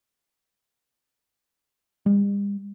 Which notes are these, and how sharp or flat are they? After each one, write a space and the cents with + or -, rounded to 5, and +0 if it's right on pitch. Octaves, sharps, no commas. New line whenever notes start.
G3 +45